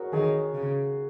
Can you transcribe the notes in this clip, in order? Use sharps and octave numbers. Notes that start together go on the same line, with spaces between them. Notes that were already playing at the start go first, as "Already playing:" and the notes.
Already playing: F#4 G#4 A#4 C#5
D#3 G#4 C#5
C#3